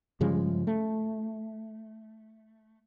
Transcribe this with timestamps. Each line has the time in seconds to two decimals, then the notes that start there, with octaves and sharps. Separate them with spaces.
0.21 G2 C#3 F3 G#3
0.67 A3